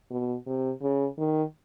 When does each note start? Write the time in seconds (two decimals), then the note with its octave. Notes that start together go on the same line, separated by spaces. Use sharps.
0.11 B2
0.46 C3
0.82 C#3
1.18 D#3